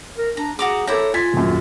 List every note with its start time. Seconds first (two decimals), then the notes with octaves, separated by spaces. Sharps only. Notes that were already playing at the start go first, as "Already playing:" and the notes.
0.18 A#4
0.37 D4 A#5
0.59 F#4 G#4 A#5 D6
0.87 E4 A4 C#5 A#5 D6 G6
1.14 F4 G#5 A6 B6
1.33 D#1 F#2